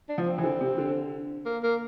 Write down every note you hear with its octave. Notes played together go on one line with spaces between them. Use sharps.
D4
F3
C4
E3
D3
C3
D3
A#3
A#3